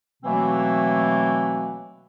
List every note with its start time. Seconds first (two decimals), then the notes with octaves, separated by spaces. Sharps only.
0.23 B2 E3 F#3 A3 A#3 C4